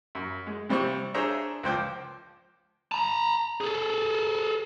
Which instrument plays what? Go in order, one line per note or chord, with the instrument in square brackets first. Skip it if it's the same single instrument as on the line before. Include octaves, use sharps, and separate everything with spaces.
[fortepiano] F#2
G#3
C3 G3 C4 C5 C#6
D4 G#4 C5 C#5 E5 A#5
C#2 F3 C5 G5 D6
[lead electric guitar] A5 A#5
G#4 A4